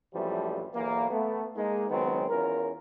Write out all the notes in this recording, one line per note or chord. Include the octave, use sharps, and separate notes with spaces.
A#1 F#2 E3 F3 G3 A3
B1 E2 E3 A#3
A3 B3
G#3 A#3 D#4
C#2 D#3 F#3 G#3 B3 C4
E2 C#4 F4 A#4